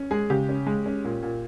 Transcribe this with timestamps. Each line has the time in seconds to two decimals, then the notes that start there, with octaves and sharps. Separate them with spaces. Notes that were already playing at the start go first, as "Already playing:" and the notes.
Already playing: C#4
0.11 G#3 G#4
0.30 C#3 G4
0.49 C#4
0.66 G#3
0.86 C#4
1.04 A#2
1.23 A#2